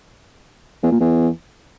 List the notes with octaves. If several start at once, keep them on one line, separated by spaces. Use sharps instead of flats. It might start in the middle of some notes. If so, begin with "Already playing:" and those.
E2
A#2
E2